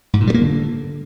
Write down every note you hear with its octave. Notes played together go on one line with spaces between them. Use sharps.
G#2
A#2
G3
A#3
D3